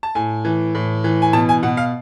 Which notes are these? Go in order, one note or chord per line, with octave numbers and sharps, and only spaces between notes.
A5
A2 G#5
E3
A2
E3
G#5
B2 A5
G#5
B2 F#5
F5